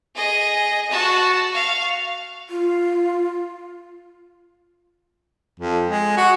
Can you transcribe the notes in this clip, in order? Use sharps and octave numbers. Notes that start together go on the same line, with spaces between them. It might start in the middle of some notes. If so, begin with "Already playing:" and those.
G#4 D#5
F#4 A5
F5 C#6
F4
F2
G#3
F#4